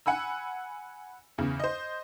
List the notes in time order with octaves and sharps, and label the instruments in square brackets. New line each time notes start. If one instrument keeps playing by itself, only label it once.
[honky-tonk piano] F#5 G#5 B5 E6
E2 C#3
C5 D#5